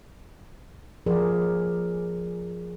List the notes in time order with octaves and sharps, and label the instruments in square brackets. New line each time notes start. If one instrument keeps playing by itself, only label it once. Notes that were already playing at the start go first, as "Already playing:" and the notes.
[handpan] F3 G#4 A#4 D5